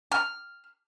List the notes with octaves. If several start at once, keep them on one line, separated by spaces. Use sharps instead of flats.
F6